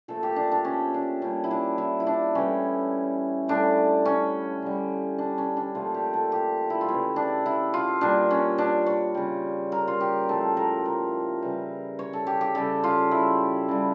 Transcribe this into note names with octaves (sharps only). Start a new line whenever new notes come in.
A#2 F3 A3 A4
G4
D4
D4
C#4
D4
A#2 G3 C#4
E4
D4
E4
E4
D4
A2 E3 G3 C#4
A2 G3 D4
C#4
D3 G3
D4
C#4
D4
A#2 F3 A3 F4
G4
A4
G4
E4
F4
C#3 E3 A3 E4
D4
E4
F4
A#2 G3 D4
C#4
D4
C#5
C#3 G3
A#4
F4
G4
A2 F3 A3 A4
A#4
A#4
C#3 E3 G3
C#5
A4
G4
G4
C#3 G3 A4
F4
E4
C#3 G3